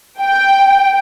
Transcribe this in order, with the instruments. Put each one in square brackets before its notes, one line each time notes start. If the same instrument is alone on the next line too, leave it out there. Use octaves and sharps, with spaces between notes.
[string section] G5